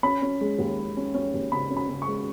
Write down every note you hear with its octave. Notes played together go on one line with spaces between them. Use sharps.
C#4 B5
C#4
G#3
D#2
G#3
C#4
C#4
D#2
C#3 B5
C#4
B5
C#3
C#6
G#3